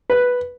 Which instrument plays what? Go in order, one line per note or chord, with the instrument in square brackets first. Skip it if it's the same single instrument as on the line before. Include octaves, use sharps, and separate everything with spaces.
[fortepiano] B4